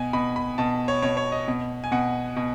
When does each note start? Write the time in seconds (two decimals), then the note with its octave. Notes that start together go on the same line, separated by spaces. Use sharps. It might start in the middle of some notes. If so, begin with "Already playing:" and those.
Already playing: B2 G#5
0.13 B2 B5
0.36 B5
0.58 B2 A5
0.88 C#5
1.02 B2 C#5
1.17 C#5
1.32 D#5
1.48 B2
1.84 G#5
1.92 B2 F#5
2.36 B2